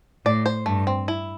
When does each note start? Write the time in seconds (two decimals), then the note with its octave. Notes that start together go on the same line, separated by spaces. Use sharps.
0.25 A2 D5
0.46 C5
0.66 G2 A3
0.87 C4
1.08 E4